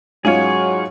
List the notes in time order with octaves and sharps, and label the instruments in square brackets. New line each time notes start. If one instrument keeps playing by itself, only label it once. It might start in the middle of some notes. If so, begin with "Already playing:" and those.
[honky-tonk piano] G#2 C#4 F4 [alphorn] F#3 [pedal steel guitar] G#4 C#5